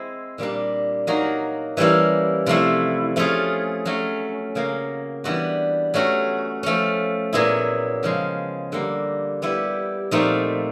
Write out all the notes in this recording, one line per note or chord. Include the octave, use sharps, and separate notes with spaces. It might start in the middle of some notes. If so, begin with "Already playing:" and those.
Already playing: G#3 C4 E4
A#2 G3 A#3 D4
F#3 A#3 D#4 F#4
E3 G3 A#3 C#4 E4
C3 F3 A3 C4 E4
F3 A3 C#4 F4 G#4
F#3 A3 C#4
C#3 F#3 A#3
E3 G3 B3 D4 F#4
F#3 A3 C#4 F#4
F3 A3 C#4
A#2 F#3 B3 E4 G#4
C#3 F3 G#3
D3 G3 A#3
G3 B3 E4 G4
A#2 F3 A3 C4 D#4